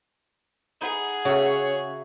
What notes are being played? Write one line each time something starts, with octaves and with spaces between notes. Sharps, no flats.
D#4 G#4 B4 F#5
C#3 F#4 C#5 E5 A#5